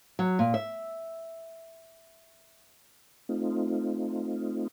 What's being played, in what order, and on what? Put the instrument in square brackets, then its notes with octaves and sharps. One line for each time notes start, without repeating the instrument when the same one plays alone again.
[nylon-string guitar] F#3
A#2
E5
[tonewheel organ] A3 C4 D#4 F4